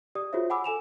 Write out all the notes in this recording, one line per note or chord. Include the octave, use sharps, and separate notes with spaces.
G4 D5 D#6
F4 F#4 G#4 C5 C#5 E5
F#5 G#5 B5 D6 E6
A4 G#5 E7 F7